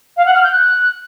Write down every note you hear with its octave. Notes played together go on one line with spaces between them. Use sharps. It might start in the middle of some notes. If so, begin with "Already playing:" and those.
F5
F#5
F6
G6
F#6